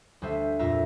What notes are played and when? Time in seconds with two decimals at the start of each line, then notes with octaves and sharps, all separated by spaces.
0.22 D2 G3 C5 E5
0.59 F2 A#2 F4 E5 A#5